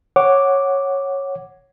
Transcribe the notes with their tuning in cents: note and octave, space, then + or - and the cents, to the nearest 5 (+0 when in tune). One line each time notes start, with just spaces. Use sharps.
C#5 -10 F#5 +0 D6 +0